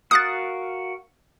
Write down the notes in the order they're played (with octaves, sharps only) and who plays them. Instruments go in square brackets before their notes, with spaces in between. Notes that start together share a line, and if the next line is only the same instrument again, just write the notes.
[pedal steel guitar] F#4 A#4 F5 [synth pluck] D#6 F#6 A6